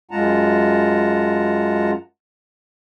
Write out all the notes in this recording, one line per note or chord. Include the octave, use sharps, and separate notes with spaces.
F#2 G#3 F4 F#5 A5 A#5